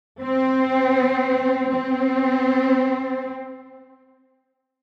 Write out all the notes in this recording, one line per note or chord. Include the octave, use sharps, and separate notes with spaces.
C4
C4